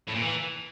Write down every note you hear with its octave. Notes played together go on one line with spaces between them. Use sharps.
A2
A#2
E3